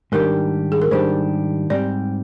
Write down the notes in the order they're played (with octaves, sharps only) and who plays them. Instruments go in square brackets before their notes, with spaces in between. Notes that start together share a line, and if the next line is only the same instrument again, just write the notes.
[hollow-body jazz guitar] G#2 D#3 G3 D4 G4 [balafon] A#4
[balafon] G#4
A#4
[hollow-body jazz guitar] G#2 D#3 G3 D4 G4 [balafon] C5
[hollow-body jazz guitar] G#2 G3 C4 G4 [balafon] D5